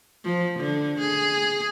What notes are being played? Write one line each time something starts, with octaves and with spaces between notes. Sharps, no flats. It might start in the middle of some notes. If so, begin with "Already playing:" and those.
F3
D3
G#4